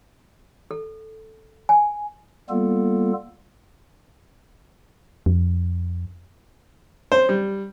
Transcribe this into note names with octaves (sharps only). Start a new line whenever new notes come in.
A4
G#5
G3 A#3 B3 F4 A4
F2
C5
G3